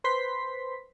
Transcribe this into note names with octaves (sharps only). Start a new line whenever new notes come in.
B4 C5 C6 B6